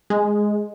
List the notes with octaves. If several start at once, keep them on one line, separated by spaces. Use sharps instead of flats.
G#3